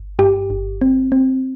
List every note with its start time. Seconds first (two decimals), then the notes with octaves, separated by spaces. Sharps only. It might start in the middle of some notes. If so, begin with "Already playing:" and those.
Already playing: G1
0.19 G2 G4
0.50 G1
0.81 C4
1.12 C4